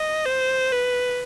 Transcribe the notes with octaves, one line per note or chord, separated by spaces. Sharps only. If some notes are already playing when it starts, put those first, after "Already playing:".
Already playing: D#5
C5
B4